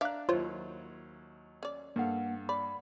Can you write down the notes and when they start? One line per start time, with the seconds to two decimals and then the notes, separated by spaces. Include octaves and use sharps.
0.01 D4 D5 E5 F5 A#5 D6 F#6
0.29 D#2 F#3 E4 F4 C5 C#5
1.63 C#4 D5
1.96 G2 A#3 A4 F5 F#5
2.49 D5 B5